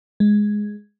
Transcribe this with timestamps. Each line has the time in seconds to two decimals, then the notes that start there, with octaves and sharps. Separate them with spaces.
0.20 G#3